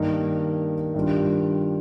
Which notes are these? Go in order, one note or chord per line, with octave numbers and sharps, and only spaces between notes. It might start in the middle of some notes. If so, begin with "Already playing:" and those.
Already playing: G2 D#3 A#3 D#4
G2 D#3 G3 D4 F4